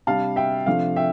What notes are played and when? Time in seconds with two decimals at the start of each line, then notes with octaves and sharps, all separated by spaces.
0.07 C3 G3 D4 F5 A5
0.36 E5 G5
0.66 C3 F3 A3 D4 F5
0.96 E5 G5